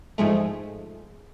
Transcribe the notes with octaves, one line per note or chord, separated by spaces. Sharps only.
G#2 F3 G#3 A3